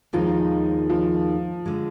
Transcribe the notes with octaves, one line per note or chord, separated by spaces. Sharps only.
D#2 D#3 F3 G#3 D#4
F3
D3 G#3